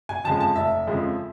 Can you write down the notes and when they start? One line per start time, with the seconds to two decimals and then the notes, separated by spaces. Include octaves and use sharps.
0.09 G#5
0.24 F2 C#3 F3 G#3 A5
0.41 A5
0.56 F1 E5
0.87 F2 C#3 F3 G#3